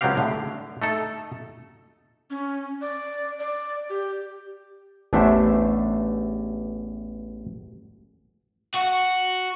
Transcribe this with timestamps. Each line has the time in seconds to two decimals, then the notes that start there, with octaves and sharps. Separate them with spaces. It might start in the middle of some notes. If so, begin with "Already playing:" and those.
0.01 C#2 F#3 G#3 C4 G4 F5
0.17 A2 D3
0.82 A3 D#4 A4
2.30 C#4
2.81 D5
3.39 D5
3.90 G4
5.13 A1 E2 A3 D4 C5 E5
8.75 F#4